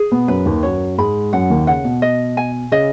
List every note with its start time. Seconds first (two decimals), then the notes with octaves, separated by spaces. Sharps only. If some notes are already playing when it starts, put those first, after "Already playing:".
Already playing: G#4
0.11 B2 B3
0.28 F#2 F#3 B4
0.46 D#2 D#3
0.63 F#2 F#3 C#5
0.98 G#2 G#3 B5
1.33 F#2 F#3 F#5
1.50 D#2 D#3
1.67 C#3 F#5
1.84 B2
2.02 D#5
2.37 G#5
2.72 C#3 D#5